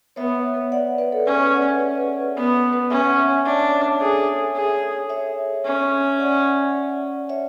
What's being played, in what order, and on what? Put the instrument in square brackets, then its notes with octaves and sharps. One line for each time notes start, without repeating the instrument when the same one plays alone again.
[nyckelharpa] B3 [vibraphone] C#5 E5
[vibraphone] D5 F#5
B4 D5
A4 C#5
[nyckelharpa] C#4 [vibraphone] G#4 B4
[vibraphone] C#5 E5
D5 F#5
[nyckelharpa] B3
[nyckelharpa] C#4 [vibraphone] E5
[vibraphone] F#5
C#5 E5
[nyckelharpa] D4 [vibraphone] C#5 E5
[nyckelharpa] G#4 [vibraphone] A4 C#5
[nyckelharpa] G#4
[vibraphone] C#5 E5
[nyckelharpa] C#4
[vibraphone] D5 F#5
C#5 E5